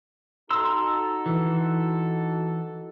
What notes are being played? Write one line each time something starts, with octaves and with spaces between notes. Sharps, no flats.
D#4 F#4 A4 A#5 C6 E6
E3